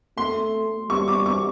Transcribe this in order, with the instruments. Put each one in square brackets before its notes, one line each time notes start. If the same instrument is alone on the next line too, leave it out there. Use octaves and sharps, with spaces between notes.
[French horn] A3 [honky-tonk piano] C6
[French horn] G3 [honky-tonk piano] C#6
[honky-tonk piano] D6
C#6